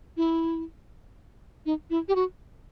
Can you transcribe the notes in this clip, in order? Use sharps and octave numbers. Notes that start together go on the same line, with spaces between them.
E4
D#4
E4
G4
F#4